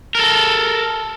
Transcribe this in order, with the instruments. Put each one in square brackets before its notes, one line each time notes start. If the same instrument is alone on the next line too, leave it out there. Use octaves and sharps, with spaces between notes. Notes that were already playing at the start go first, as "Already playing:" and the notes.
[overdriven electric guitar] A4 A#4